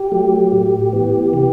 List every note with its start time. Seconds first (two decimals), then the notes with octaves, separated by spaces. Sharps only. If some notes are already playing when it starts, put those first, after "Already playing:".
Already playing: G4
0.12 F#3 A3
0.52 A2
0.93 E3 B3
1.33 C3 G4